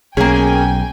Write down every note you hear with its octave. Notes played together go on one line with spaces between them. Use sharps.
B1 A#3 C#4 G#4 G5 G#5